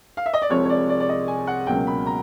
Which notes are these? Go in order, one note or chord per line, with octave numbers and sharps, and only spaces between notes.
F5
E5
D#5
D5
C2 C3 F3 G#3 C#5
C#5
D5
D5
D5
D#5
G#5
F#5
C#2 B2 F#3 A#3 C#4 G5
B5
A#5